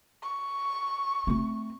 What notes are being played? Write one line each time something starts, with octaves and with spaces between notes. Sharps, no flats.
C#6
A3 C4